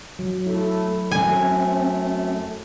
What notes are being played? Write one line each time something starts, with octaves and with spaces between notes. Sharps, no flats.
F#3
A3 E4 A4
F#2 A3 C4 G#5